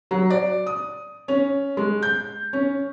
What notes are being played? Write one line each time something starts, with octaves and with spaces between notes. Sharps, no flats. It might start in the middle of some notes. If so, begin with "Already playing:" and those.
F#3
D5
D#6
C#4
G#3
G6
C#4